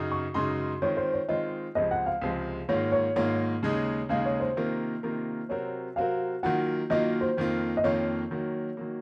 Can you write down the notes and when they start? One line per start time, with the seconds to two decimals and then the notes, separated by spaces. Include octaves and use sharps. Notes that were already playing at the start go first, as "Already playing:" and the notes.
Already playing: F#2 C#3 D#4
0.12 C#6
0.34 F#2 C#3 G#3 D#4 C6
0.82 D#3 G#3 C4 F4 C#5
0.97 C5
1.13 C#5
1.28 D#3 G#3 C4 F4 D#5
1.75 C#2 C3 F3 G#3 C4 D#5
1.91 F#5
2.06 F5
2.22 C#2 C3 F3 G#3 C4
2.69 G#2 D#3 A#3 F4 C#5
2.92 C#5
3.16 G#2 D#3 A#3 F4 C#5
3.63 D#2 C#3 G#3 D#4
4.09 D#2 C#3 G#3 D#4 F5
4.25 C#5
4.40 C5
4.56 C3 D#3 A#3 F4 A#4
5.03 C3 D#3 A#3 F4 A#4
5.49 C3 F#3 C4 F#4 A#4 C#5
5.96 C3 F#3 C4 F#4 A#4 F5
6.43 D#3 F#3 A#3 F4 F#5
6.90 D#3 F#3 A#3 F4 D#5
7.21 C5
7.37 F2 D#3 A#3 F4
7.77 D#5
7.84 F2 D#3 A#3 F4 C#5
8.31 D#3 F#3 A#3
8.77 D#3 F#3 A#3